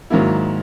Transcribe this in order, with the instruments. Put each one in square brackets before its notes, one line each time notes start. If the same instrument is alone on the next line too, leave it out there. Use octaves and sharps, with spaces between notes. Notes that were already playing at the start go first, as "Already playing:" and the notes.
[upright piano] G#2 D#3 F#3 A#3 E4